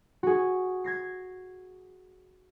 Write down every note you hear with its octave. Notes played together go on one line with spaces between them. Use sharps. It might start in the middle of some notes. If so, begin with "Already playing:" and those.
F#4 G#4
G#6 A#6 C7